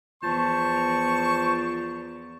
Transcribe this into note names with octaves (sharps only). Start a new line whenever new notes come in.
E2 F3 C5 A5 C#6